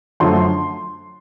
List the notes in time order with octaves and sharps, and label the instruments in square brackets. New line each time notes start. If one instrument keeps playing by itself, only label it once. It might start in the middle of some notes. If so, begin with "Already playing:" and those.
[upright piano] F#2 D3 F3 A3 C6